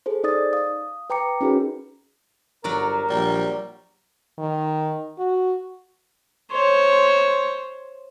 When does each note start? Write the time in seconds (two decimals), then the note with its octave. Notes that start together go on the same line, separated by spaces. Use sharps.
0.06 G#4 A4 C5
0.24 D#4 D5 D#6 A6
0.53 F5 D#6
1.10 B4 G5 A#5 D6 C#7
1.41 C#4 D#4 F#4 G#4 A#4 B4
2.64 G1 F#3 F#4 A#4 D5
3.10 A#1 G3
4.39 D#3
5.19 F#4
6.52 C5 C#5